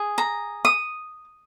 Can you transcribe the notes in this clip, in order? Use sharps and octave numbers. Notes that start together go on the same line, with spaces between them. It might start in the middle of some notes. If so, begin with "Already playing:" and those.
Already playing: G#4
A#5
D#6